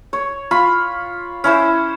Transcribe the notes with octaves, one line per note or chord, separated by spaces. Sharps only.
C#5
F4 B5 C#6
C#4 E4 C5